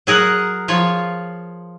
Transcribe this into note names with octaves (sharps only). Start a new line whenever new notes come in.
F#3 G#4 A#4 F#5
F3 F4 C#5